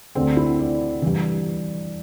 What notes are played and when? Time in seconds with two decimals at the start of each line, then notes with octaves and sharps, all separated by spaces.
0.15 D2 D3 C4
0.37 E4
0.59 D5
1.02 G2 E3